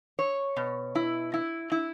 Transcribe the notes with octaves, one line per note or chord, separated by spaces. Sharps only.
C#5
B2
E4
E4
E4